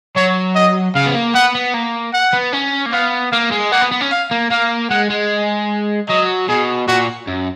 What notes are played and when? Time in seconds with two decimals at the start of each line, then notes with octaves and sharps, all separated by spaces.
0.16 F#3 C#5
0.55 D#5
0.95 C#3 F5
1.06 B3
1.15 A#3
1.34 B3 F#5
1.55 B3
1.74 A#3
2.13 F#5
2.33 B3
2.52 C#4
2.86 A#3
2.92 B3 F5
3.32 A#3 F5
3.51 G#3
3.72 A#3 F#5
3.81 B3
3.92 B3
4.01 C#4
4.11 F5
4.31 A#3
4.51 A#3 F5
4.90 G#3 F#5
5.10 G#3
6.09 F#3 D#5
6.48 B2 G#4
6.88 A#2 F#4
7.27 F#2